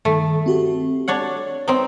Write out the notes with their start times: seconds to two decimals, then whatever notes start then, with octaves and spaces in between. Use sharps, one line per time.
0.05 G2 D#3 A3
0.46 C4 F#4 G4
1.08 D4 C#5 F#5
1.68 C4 D#4 B4